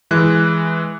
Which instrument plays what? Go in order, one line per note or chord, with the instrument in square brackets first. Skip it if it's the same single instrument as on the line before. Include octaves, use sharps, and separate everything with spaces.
[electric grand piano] E3 G#3 F#6